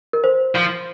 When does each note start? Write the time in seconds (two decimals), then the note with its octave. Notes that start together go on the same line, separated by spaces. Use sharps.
0.13 A#4
0.24 C5
0.55 F3